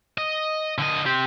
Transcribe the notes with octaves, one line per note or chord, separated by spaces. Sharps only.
D#5
D3 D#5
C4 G4